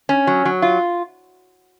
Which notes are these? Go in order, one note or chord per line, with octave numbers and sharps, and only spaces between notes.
C#4
F#3
F#3
F4